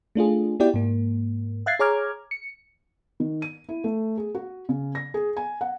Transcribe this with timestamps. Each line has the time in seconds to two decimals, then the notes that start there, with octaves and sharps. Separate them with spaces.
0.15 A3 D4 F4 G#4
0.60 B3 E4 F#4 G4 D5 G5
0.74 G#2 A#3
1.66 E5 F5 F#6 G#6 A6 C7
1.79 G#4 C#5 A#5 D6 F6 G#6
2.31 C#7
3.20 D#3
3.42 D#7
3.69 E4
3.84 A3
4.17 G#4
4.35 F#4
4.69 C#3
4.95 A#6
5.14 G#4
5.37 G#5
5.61 F#5